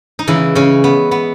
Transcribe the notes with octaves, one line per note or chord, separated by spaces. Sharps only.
D#4
C#3 E3 G#3 E4
C#3 C#4
B3
B3